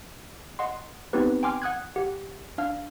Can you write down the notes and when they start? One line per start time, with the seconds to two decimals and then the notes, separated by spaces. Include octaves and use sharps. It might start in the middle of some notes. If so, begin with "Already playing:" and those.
0.59 D#5 F#5 C6
1.13 B3 C4 D#4 G4 B4
1.43 G5 G#5 C6 D6 F6
1.62 F#5 D#6 F#6 G#6
1.96 G4 F#5
2.58 D4 F5 F6